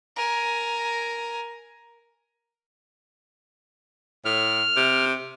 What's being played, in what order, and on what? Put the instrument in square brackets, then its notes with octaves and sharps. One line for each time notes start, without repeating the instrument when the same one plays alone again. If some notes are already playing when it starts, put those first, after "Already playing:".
[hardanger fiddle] A#4 G#5
[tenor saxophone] A2 [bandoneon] F6
[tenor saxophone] C3